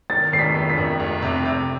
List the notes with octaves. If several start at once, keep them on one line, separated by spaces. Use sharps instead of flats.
D#3 A6
F1 C7
B6
D#3
B6
F2
F1
C3
C3